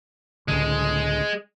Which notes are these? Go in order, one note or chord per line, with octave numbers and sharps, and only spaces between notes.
C#2 A2 D3 G#3